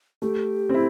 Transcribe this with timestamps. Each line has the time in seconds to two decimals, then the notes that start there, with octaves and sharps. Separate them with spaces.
0.22 A3 G4
0.69 C4 E4